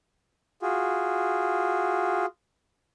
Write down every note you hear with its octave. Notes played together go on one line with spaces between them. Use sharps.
F4 F#4 G#4